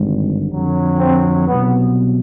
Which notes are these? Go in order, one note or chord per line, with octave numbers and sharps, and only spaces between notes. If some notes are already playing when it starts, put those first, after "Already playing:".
Already playing: G#1 G2 D3
F2 D3 F#3
C4
C2 B2 F#3 B3